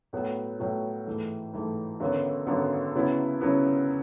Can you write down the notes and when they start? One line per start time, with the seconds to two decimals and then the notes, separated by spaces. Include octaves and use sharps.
0.13 A2 F#3 B3 F#4
0.60 A2 F#3 B3 F#4
1.07 G#2 E3 A3
1.53 G#2 E3 A3
2.00 G#1 F#2 D3 F#3 B3
2.47 G#1 F#2 D3 F#3 B3
2.94 C#3 F#3 B3 E4
3.41 C#3 F#3 B3 E4